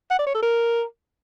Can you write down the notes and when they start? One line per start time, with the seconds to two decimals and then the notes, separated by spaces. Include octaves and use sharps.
0.11 F#5
0.19 D5
0.27 C#5
0.35 A4
0.43 A#4